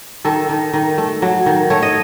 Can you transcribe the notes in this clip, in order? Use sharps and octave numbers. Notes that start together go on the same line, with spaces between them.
D#3 A4
D#3
D#3
A3
F#3
D#3
A3 C#5
D#5